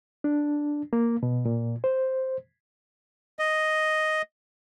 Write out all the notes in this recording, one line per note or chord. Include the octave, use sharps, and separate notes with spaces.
D4
A#3
B2
A#2
C5
D#5